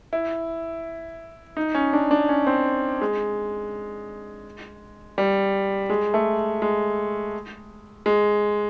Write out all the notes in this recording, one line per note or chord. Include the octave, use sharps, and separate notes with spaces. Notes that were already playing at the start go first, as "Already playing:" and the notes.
E4
D#4
C#4
D4
D4
C#4
C4
G#3
G3
G#3
A3
G#3
G#3